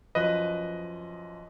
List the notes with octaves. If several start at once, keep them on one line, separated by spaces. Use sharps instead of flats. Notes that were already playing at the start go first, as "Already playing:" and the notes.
F#2 F3 B4 D#5